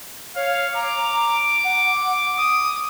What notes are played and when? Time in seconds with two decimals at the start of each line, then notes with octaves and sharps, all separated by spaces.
0.36 C#5 F5
0.74 A#5 D6
1.64 F#5
2.38 D#6